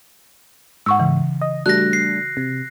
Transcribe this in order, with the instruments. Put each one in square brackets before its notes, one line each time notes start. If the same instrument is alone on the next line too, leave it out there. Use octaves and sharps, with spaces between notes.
[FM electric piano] G#2 [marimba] F#5 C#6 E6
[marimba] C#3 E3
[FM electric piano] D#5
[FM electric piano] G3 A3 D4 [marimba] F#4 [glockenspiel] F#6 A#6
[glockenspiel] C7
[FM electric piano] C3